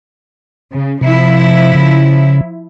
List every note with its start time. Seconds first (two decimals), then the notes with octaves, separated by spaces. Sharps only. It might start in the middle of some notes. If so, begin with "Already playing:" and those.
0.72 C#3
1.01 C3 F3 E4
1.75 C#3